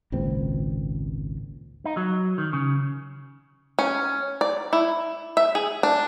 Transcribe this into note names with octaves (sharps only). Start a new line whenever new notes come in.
G#1 C#2 A#2 C4
D#4
F#3
D#3
C#3
C#4
D5
E4
E5
G#4
D4